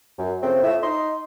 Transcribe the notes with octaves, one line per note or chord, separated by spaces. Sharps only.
F#2
C#3 F3 A3 C4
F2 A2 E5
D#4 D#5 C6